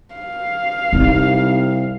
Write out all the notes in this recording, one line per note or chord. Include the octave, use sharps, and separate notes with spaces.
F5
C2 C4 D#4